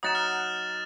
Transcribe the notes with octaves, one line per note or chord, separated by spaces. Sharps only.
F#3 D#4 F#5 D#6 A6 E7
F6